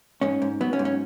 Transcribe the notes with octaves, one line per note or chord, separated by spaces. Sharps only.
G#2 C#4
G#2
F#3 B3
C#4
G#2
C#4